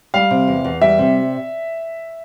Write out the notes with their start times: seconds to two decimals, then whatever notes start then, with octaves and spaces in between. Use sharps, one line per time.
0.14 G3 F5
0.31 C3
0.48 E2
0.65 E2
0.81 G3 E5
0.99 C3